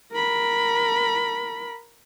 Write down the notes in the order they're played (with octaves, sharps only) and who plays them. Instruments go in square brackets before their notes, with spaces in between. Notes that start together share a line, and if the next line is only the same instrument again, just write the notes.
[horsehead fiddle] A#4 B5